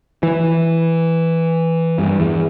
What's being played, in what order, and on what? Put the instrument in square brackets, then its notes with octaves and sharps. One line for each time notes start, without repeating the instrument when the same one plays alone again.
[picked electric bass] E3
G2
E2